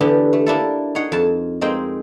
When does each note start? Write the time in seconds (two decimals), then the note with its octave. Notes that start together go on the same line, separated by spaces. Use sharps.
0.01 D3 E3 B3 D4 G4
0.33 A3
0.46 A#3 D4 E4 A4
0.95 D#4 G#4 C#5 F#5
1.12 F2 A5
1.61 G#3 A#3 C4 D#4 G5